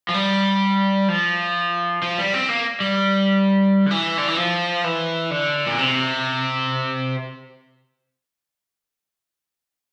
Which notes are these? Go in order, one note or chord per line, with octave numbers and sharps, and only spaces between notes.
F3
G3
F3
F3
G3
C4
A#3
G3
D3
E3
D3
E3
F3
E3
D3
A#2
C3